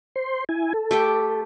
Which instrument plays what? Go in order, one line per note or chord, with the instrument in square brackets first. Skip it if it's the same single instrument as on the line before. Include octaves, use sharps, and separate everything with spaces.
[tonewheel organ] C5 C6
E4 G#5
A4
[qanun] A3 G4 G5